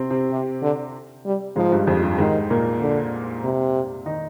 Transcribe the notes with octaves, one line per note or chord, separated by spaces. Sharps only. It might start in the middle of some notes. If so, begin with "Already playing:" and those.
Already playing: C3 C4
C3 C4
C3
D3
G3
G#2 F3 G#3
G2 G3
F2 F3
G2 G3
G#2 D#3 G#3
A#2 A#3
D3
C3
D#3 D#4